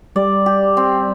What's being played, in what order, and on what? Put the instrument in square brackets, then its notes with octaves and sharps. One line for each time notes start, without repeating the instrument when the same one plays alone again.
[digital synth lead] G3 [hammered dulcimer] D5
[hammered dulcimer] G4
C4